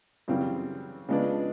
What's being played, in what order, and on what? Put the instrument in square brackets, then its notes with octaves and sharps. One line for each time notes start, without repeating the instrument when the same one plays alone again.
[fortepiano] F#2 C#3 E3 G3 C4
C#3 F3 G#3 B3 D4